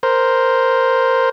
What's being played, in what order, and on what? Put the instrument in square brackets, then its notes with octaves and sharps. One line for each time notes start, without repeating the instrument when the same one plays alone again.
[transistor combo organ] A#4 C5